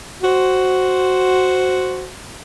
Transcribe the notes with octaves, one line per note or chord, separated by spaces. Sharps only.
F#4 C5